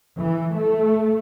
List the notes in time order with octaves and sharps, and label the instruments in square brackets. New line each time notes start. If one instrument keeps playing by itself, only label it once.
[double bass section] E3
A3